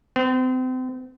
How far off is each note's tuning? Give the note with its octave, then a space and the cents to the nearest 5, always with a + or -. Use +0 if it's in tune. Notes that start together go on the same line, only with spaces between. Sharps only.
C4 -35